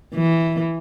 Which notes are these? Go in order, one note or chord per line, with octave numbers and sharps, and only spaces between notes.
E3